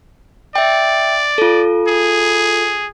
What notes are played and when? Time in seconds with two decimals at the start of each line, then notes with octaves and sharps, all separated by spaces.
0.56 D5 E5 G5
1.38 F4 A4
1.88 G#4